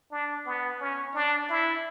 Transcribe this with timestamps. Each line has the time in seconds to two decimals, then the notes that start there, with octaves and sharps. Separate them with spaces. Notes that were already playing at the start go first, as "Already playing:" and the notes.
0.12 D4
0.46 B3
0.81 C#4
1.15 D4
1.50 E4